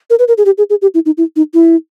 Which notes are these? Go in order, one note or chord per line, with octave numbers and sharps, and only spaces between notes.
A#4
B4
A#4
G#4
G4
G#4
G#4
G4
E4
D#4
E4
D#4
E4